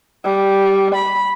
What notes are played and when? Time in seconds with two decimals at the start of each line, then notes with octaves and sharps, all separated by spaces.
0.24 G3
0.95 B5